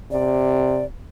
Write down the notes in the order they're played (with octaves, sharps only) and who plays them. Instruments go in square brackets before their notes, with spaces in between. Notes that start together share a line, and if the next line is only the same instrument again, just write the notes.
[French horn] C3 [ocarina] D5